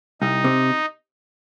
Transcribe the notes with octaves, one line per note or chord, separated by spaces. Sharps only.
C2 D#4
C3